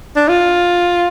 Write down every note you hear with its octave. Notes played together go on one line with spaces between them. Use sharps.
D4
F4